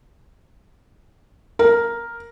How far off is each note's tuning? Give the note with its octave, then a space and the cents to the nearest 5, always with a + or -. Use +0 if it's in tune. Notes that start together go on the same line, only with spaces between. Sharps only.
A#4 +0